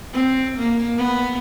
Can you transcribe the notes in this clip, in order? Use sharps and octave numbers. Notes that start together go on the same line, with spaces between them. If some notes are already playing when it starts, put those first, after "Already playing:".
C4
A#3
B3